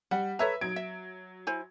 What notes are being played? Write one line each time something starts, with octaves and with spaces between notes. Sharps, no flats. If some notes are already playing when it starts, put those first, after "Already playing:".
G3 F#5
A4 B4 C#5 E5 A#5
F#3 D#4 G#6 D7
E5
E4 C5 G#5